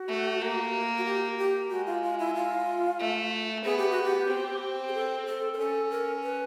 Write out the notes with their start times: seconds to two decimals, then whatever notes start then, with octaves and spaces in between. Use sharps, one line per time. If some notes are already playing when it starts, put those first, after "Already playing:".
Already playing: F#4
0.09 A3
0.41 A#3
0.98 F#4
1.05 G4
1.38 G4
1.70 G#3 F#4
1.86 F4
2.03 F4
2.19 E4
2.35 F4
2.99 A3
3.64 B3 G#4
3.78 G4
3.90 F#4
4.03 G4
4.29 C4
4.88 G#4
4.94 A4
5.26 A4
5.53 A#4
5.58 C#4 A4
5.90 A#4
6.23 B4